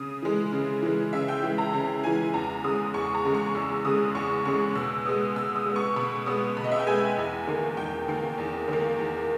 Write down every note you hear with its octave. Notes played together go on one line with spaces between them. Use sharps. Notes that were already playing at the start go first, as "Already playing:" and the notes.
Already playing: C#3 D#6
E3 G#3
C#3
E3 G#3
C#3 E5
G5
E3 G#3 G5
A#5
C#3 A#5
E3 G#3 G#5
E2 A#5
C#3 G#3 D#6
E2 C#6
A#5
C#3 G#3
C#6
E2 E6
C#3 G#3 D#6
E2 C#6
C#3 G#3 C#6
B2 E6
G#3 B3 D#6
B2 E6
D#6
G#3 B3
C#6
B2 B5
G#3 B3 D#6
B2 B5
D#5
E5
G5
G#3 B3 G#5
E2
D#3 A#3
E2 G5
D#3 A#3
E2
D#3 A#3
E2